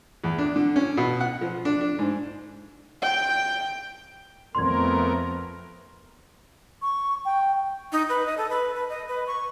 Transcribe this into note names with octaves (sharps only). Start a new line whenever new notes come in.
E2
D4
D3
C#4
B2
F#5
F3
D4
D4
G#2
G5
F2 A3 B3 A#4 C6 G#6
C#6
G5
D#4
B4
D#5
A4
B4
B4
D#5
B4
C#6